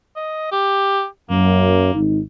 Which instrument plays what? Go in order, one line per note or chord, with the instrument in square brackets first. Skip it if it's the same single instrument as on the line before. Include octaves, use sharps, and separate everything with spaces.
[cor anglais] D#5
G4
[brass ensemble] F#2 [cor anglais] A#3
[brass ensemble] G#1 D#4